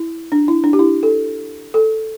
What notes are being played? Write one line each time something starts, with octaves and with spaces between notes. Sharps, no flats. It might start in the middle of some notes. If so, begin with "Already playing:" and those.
Already playing: E4
D4
E4
D4
G4
E4
A4
A4